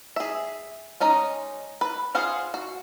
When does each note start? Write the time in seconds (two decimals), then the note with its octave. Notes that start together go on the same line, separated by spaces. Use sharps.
0.16 G#4 E5
1.00 G#3 C#4 D#4 D#5
1.81 B4
2.15 F4 G#4 C5 F5 F#5
2.54 F#4